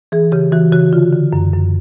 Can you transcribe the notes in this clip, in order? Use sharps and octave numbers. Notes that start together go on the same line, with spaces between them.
E3 G#4
C#3 G4
E3 F#4
C#3 F#4
D3 F4
D3
F#2
F#2